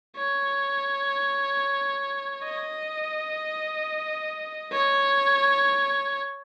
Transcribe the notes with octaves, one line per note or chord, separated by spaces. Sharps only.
C#5
D#5
C#5